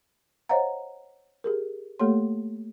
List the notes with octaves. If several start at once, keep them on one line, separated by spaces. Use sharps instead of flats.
C5 C#5 D#5 F5 F#5 A#5
G4 G#4 A#4
A3 A#3 G4 A4 C#5 C6